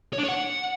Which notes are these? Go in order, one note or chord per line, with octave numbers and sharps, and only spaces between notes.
C#5
D4
C#5
F#5